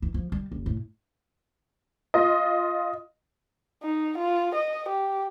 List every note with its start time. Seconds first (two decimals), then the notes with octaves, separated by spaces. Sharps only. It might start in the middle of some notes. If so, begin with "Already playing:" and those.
0.02 E3
0.14 F3
0.32 G3
0.52 F#1
0.66 A2
2.14 F4 D#5
3.83 D#4
4.18 F4
4.55 D#5
4.89 G4